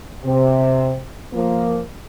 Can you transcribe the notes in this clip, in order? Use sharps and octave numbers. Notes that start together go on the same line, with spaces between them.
C3
F3 A#3